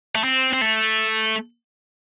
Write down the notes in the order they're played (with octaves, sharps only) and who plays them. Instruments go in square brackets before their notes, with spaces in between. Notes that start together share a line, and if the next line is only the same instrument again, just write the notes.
[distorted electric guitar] A3
C4
C4
A3